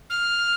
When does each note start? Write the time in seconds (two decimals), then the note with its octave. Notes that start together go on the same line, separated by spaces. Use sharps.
0.10 F6